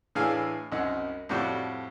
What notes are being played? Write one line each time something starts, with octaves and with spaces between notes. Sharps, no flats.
A2 E3 D4 G#4 F5 G#5
C2 F#2 D#4 F#5
F2 A2 G3 F#4